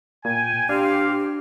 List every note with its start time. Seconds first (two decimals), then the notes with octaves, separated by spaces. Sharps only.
0.25 A#2 G5 G#5
0.69 C4 D4 G4 F5